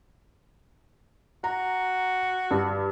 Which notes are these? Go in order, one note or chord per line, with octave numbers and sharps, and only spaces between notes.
F#4 A#5
G2